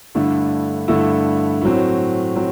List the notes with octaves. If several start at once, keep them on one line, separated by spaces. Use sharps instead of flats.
G2 D3 A3 E4
G2 D3 A3 E4
A2 F#3 C4
F#3 C4